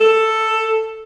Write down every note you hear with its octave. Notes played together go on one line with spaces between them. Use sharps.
A4